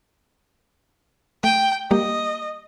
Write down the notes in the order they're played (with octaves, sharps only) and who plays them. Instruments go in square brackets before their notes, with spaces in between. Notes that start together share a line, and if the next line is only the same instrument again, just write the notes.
[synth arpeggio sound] A3 D#7 [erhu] G5
[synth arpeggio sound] G3 A#3 G4 [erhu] D#5